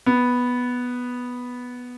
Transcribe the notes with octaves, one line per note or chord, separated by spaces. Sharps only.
B3